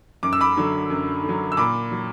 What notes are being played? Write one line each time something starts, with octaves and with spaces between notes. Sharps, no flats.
F#2 D6
E6
B5 D6
D3 F#3
F#2
D3
F#3
E6
A#2 B5 D6
F#3